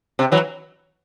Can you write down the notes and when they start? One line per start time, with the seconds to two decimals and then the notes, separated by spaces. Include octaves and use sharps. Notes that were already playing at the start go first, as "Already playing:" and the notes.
0.19 C3
0.32 E3 F#3